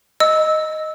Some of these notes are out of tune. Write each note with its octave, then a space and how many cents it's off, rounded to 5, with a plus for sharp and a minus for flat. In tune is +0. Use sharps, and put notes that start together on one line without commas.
D#5 +0 E6 -15